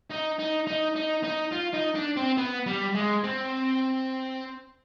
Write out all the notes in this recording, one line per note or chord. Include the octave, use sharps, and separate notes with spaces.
D#4
D#4
D#4
D#4
D#4
F4
D#4
D4
C4
B3
G3
G#3
C4